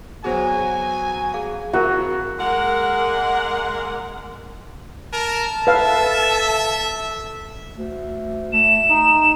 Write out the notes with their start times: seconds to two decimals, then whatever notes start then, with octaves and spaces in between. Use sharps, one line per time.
0.24 F#3 B3 F#4 G#4 C5 G#5
1.34 G#4 F5
1.73 F2 E4 F#4 G#4 A#4
2.39 G#3 A#3 A#4 F#5
5.13 A#4 A5
5.67 A4 B4 E5 F5
7.76 D2
8.53 A3 E7
8.90 D#4